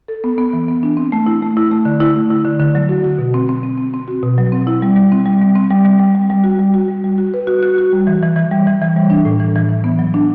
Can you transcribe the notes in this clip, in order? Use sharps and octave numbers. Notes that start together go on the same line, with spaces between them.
A4
B3
B3
E3
B3
D4
C4
A3
E4
A3
E4
A3
D3
E4
A3
E4
D3
D3
F#3
F#4
F#4
B2
C4
C4
C4
C4
C4
F#4
B2
F#3
C4
E4
G3
G3
C4
G3
G3
C4
G3
G3
G3
G3
G3
F#4
G3
F#4
G3
G3
F#4
B4
F#4
F#4
F#4
G3
E3
E3
E3
G3
E3
E3
G3
D4
A2
E3
E3
E3
B3
F#3
D4